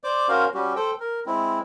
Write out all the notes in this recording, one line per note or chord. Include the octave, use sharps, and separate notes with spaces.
C5 D5 D6
C#4 F#4 A#4 C5 F5
G3 C#4 F#4 G4
A4 C5 G5
A#4
G#3 C4 E4